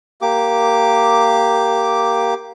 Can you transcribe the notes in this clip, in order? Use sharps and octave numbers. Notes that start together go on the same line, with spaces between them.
A#3 G4 D6